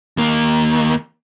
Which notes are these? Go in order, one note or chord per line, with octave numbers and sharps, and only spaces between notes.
D#2 A#3